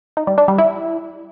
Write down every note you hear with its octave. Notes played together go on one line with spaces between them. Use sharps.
D#4
G3
D4
G3
E4